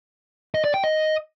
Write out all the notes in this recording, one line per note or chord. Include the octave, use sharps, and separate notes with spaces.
D#5
D5
G5
D#5